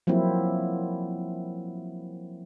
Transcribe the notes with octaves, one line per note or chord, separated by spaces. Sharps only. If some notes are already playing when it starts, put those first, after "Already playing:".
F3 F#3 A#3 C4 E4